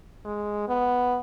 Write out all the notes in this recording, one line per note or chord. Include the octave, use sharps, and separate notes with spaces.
G#3
B3